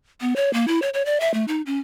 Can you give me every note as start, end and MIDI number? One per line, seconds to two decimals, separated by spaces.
0.21 0.34 59
0.36 0.52 73
0.53 0.66 58
0.68 0.80 64
0.82 0.89 73
0.94 1.05 73
1.06 1.18 74
1.21 1.33 76
1.34 1.45 57
1.48 1.62 63
1.66 1.79 61